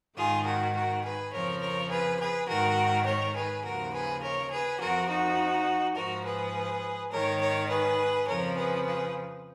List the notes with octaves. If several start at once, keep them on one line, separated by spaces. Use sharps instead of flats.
G#2 D#3 F4 G#4
F#4 A#4
F#4 A#4
G#4 B4
F2 C#3 F3 A#4 C#5
A#4 C#5
G#4 B4
G#4 B4
G#2 D#3 F#4 A#4
A#4 C#5
G#4 B4
D#2 C#3 F3 F#4 A#4
G#4 B4
A#4 C#5
G#4 B4
F2 F3 F#4 A#4
D#4 F#4
G#2 F3 F#4 A#4
G#4 B4
G#2 D#3 A#4 C#5
A#4 C#5
G#4 B4
F2 C#3 F3 A#4 C#5
G#4 B4
G#4 B4